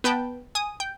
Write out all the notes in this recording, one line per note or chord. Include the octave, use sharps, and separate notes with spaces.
B3 B4 G5 A5
G#5 D#6
G5